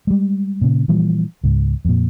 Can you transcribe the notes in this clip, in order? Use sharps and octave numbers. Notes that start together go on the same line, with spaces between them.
G3 G#3
A#2 C#3
A#2 E3 F3 G3
C#2 G#2
F2 A#2